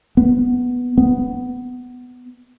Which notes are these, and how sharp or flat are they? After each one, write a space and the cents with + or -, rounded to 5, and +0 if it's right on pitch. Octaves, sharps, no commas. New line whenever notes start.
B3 +0
B3 +10